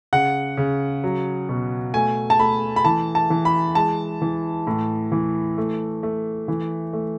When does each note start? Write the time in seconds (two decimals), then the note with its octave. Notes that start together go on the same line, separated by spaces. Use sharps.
0.13 C#3 F#5
0.57 C#3
1.04 F#3
1.49 B2
1.94 A3 G#5
2.30 A5
2.39 A3 B5
2.76 B5
2.85 E3 A5
3.15 A5
3.30 E3
3.45 B5
3.75 G#3 A5
4.22 E3
4.67 A2
5.12 E3
5.58 A3
6.03 A3
6.48 E3
6.93 A3